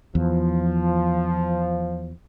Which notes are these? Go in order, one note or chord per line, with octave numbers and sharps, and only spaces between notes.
E2 F3